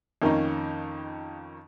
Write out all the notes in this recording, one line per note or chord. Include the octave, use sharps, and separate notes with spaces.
F2 D#3 A#3 C#4 D#4